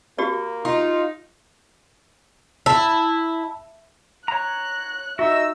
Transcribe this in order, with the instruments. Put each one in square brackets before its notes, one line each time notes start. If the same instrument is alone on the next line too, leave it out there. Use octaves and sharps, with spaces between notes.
[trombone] A#3 [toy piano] F#4 G4 D5
[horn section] D#4 [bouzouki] F4
[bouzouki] E4 [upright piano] A5
[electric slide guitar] C#5 A#5 [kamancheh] F#6
[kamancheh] D#4 E6 [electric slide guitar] F#4 D#5 [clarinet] E5